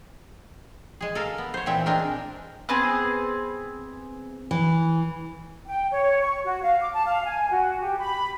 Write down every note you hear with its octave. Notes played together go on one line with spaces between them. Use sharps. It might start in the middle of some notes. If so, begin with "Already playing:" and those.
G#3 G#4
A4 A#4 F5
B3
C5 C#5
A#2 E3 C4 E5
G#3 C4 D4 A#4
B3 C4 G#4
E3
G5
C#5
C#6
F#4
F5
D6
A5
F5
G#5
F#4
G4
B5